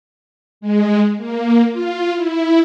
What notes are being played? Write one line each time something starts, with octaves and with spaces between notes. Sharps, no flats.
G#3
A#3
F4
E4